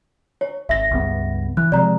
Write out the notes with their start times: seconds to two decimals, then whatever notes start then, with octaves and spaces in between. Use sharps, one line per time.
0.41 C#5
0.69 G#1 E5 A#6
0.91 C#2 G2 B3
1.57 E3 F#6
1.72 C3 F3 G#3 D5 A#5